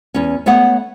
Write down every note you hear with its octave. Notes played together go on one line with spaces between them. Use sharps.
E2 C#4
A3 B3 C#5 E5 F#5